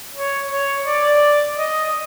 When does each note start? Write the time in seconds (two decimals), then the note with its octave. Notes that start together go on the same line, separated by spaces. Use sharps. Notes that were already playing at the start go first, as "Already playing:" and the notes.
0.15 C#5
0.52 C#5
0.86 D5
1.58 D#5